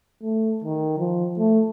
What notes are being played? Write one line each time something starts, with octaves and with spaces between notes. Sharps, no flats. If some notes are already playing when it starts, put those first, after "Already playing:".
A3
D#3
F3
A3